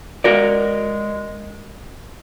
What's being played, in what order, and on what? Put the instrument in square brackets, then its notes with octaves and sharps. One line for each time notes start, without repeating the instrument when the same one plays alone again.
[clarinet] G#3 [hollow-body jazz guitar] F#4 A#4 D5